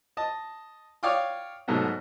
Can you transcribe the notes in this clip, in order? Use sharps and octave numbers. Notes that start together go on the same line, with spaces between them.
D#5 A5
C#5 D5 F5 G5 D6 D#6
G#2 B2 F#3 A3